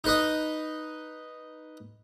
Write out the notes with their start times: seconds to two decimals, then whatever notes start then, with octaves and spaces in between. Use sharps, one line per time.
0.04 D#4 B4 D#5